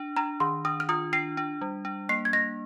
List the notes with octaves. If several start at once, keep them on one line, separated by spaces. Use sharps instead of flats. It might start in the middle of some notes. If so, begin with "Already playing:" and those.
Already playing: D4
D4 A#5
D#3 C6
D4 D#6
F6
F4 D#6
D4 C7
D4
G3
D4
A#3 C7
G#6
A#3 A#6